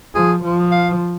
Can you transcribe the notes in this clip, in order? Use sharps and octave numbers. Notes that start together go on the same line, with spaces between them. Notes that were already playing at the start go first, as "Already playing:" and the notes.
F3 G#4
F3
F5